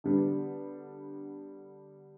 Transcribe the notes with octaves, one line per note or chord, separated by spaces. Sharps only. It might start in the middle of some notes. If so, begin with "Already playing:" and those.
D3 G3 B3 D4